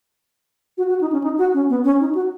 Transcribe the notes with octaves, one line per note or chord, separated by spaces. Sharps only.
F#4
F#4
D#4
C#4
D#4
F#4
C#4
B3
C#4
D#4
F#4